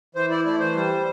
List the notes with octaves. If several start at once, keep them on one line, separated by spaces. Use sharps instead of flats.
E3 C5
E4 D5
A3 D5
E3 C5
G3